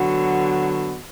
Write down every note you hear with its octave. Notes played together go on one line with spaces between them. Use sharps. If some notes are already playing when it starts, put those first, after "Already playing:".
Already playing: D3 F#3 B3 F#4